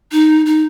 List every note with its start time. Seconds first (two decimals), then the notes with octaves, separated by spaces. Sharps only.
0.12 D#4
0.46 D#4